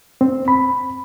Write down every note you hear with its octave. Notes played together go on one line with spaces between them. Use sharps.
C4
B5